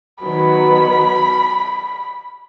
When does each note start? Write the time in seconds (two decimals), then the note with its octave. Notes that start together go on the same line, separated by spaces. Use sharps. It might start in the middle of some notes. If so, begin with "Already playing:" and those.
0.22 D#3 F#3 B3 B5